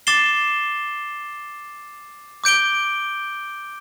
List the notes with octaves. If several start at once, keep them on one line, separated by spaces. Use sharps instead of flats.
D6 A6 C7 E7 G7
D6 G6 D7 G7